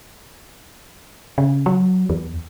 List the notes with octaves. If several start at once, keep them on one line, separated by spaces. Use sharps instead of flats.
C#3
F#3
E2